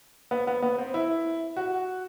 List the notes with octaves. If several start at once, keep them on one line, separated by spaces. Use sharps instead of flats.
B3
B3
B3
C4
E4
F#4